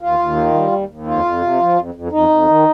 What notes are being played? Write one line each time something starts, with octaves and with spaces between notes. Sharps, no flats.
D#2 F4
D#2
D#3
G3
D#2
D#2
F2 F4
F2
C3
F3
F2
F2
F2 D#4
F2
D#3